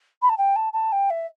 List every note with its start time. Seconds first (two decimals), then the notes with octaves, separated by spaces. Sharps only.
0.22 B5
0.29 A5
0.38 G5
0.56 A5
0.73 A5
0.92 G5
1.10 E5